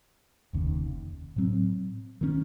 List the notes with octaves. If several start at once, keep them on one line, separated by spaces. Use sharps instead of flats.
F1 D#2 C#3
A2 F#3 C4
D#3 A#3 C#4